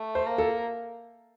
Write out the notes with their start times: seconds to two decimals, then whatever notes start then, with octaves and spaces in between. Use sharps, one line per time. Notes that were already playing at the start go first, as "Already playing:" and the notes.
Already playing: A3
0.15 C5
0.26 A#3
0.38 A4